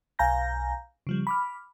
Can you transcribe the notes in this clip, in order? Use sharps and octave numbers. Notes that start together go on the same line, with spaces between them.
B1 F5 G#5 A#5 G6 A#6
C#3 F3 G3
B5 D6 F6